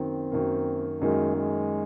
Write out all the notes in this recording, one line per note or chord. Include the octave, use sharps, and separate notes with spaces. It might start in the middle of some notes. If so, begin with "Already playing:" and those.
Already playing: F#2 D#3 A#3 C4
F#2 D#3 A#3
F#2 D#3 G#3 A#3
G#3